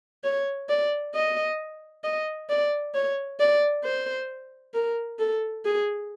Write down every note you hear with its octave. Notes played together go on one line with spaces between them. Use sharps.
C#5
D5
D#5
D#5
D5
C#5
D5
C5
A#4
A4
G#4